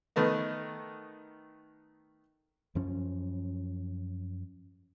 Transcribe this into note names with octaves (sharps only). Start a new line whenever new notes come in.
D#3 A3 B3 D#4
F#2 F3 C#4